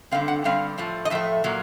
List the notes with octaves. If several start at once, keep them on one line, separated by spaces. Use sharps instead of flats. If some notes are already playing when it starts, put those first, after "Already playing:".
G2 D3 G3 C4 F5
F#5
G2 D3 G3 C4 F5
A2 F3 A3
D#5
A2 F3 A3 E5
A#2 F#3 A#3